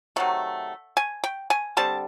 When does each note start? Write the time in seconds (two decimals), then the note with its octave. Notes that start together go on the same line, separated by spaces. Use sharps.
0.16 C3 D#3 F#3 A3 F#5
0.97 G#5
1.24 G5
1.50 G#5
1.77 D3 G3 C4 A5